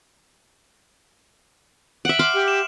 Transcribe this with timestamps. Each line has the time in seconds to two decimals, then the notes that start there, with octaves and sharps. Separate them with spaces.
2.05 E5 F#5 D7 F#7
2.19 C6 D6 F6
2.34 G4
2.48 E7